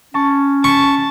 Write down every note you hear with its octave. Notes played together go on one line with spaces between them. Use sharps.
C#4 A5 C#6
A5 C#6 B6 D7